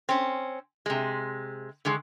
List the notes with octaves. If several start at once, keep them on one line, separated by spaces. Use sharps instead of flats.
C4 C#4
C3 G#3
D3 D#3 G#3